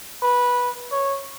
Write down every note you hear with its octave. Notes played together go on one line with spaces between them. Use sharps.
B4
C#5